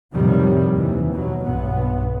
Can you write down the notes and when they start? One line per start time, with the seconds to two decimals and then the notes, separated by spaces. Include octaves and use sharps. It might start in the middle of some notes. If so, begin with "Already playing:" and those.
0.13 F2 A2 C3 D#3 F#3 G3
0.74 D#2 C3 E3
1.12 B2 F#3
1.43 B1 G2 B3